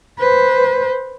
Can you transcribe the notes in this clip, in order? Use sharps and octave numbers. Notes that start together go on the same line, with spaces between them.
B4 C5